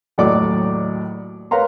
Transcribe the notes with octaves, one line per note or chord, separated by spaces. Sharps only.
D#2 A2 F#3 D5 D6
A#4 B4 C#5 F5 A#5 C6